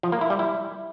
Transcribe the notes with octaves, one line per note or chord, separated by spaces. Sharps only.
F3
A#3
E4
G3
E4